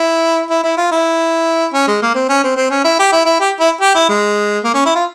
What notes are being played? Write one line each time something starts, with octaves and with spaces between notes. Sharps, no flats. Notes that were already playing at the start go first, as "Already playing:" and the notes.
Already playing: E4
E4
E4
F4
E4
C#4
G#3
A#3
C4
C#4
C4
C4
C#4
E4
G4
E4
E4
G4
E4
G4
E4
G#3
A#3
C#4
E4
F4